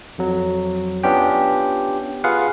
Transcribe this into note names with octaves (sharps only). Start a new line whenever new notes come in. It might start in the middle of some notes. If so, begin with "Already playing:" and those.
F2 F#3
B3 C#4 D4 F4 G4 G5
F4 G#4 B4 F5 F#5